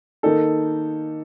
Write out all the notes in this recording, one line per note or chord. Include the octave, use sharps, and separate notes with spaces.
D#3 A#3 D#4 A4